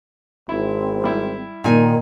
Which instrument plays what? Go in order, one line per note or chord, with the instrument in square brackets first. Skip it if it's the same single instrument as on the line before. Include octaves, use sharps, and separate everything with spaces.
[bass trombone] G#1 [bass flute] C4 [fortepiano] E4
[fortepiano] G3 E4
[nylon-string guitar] A#2 D#4 G#5 [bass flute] D#3